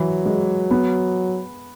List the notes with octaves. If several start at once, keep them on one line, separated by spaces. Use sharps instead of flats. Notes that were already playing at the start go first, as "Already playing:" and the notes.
Already playing: E3 F#3
G#3
B3